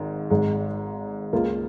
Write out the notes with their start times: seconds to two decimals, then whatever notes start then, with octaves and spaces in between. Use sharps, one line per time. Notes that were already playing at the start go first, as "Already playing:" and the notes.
Already playing: G#1 G#2 D#3
0.30 G#1 G#2 G#3
1.33 C#2 C#3 A#3 F4